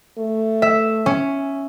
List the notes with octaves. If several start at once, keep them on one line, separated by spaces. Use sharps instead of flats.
A3
E5
C#4